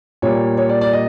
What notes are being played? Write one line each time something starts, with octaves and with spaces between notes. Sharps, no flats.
A#2 G3 A#3 C#5
C#5
D5
D5
D#5